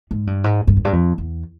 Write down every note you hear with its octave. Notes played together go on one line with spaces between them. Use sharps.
G#2
G2
G#2
G2
F2
G2
F2
E2